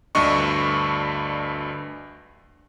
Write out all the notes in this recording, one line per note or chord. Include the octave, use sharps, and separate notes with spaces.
D2 G2 D4 D#5 C#6